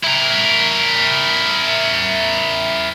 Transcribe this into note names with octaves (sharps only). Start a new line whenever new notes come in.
E4 A#4